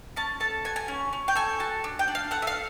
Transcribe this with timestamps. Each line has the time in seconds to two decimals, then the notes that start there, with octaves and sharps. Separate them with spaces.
0.16 C#4 A5
0.40 A4 A5
0.65 F#4 G#5
0.76 G#5
0.88 C#4
1.13 C#4
1.28 G5
1.35 A4 G#5
1.60 F#4 A5
1.84 D4
1.99 G5
2.08 D4
2.15 F5
2.31 A4 F#5
2.42 E5
2.47 F5